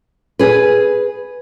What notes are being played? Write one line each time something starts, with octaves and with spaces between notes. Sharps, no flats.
G#4 B4